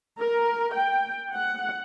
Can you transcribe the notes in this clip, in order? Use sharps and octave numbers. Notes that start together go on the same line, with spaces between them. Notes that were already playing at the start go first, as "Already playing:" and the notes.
A#4
G5
F#5